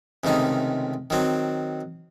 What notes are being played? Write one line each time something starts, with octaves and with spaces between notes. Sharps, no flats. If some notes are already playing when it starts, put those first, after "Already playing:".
C#2 C3 D#3 A3 D#4
D#3 F#3 C4